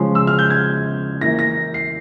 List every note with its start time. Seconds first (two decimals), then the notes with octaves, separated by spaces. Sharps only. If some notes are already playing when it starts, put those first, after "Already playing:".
Already playing: C#3 F3 G#3 C#4 C6
0.15 E6
0.27 F6
0.39 G6
0.50 G#6
1.21 E3 A#3 E4 A#6
1.39 A#6
1.74 C7